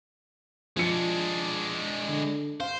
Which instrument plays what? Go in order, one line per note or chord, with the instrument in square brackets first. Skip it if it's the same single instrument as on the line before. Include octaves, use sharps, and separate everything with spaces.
[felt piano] F3 C#7 [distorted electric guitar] G#3 D4
[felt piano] D3
[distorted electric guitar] C5 [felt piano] F5